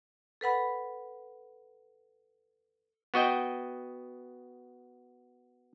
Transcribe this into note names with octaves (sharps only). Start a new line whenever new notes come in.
A4 B4 F#5 B5
B3 F#4 D#5 G5